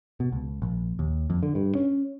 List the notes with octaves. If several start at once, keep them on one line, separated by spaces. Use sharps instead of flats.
B2
C#2
A#1
D#2
F2
D3
G2
C#4